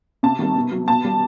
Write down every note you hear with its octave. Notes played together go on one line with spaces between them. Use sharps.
C3 A5
D#3 G3
B2
F#3
B2 A5
G3